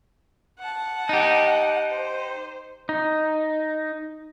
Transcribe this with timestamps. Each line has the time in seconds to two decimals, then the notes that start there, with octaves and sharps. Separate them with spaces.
0.59 F#5 A5
1.09 D#4 G4
1.90 C5
2.89 D#4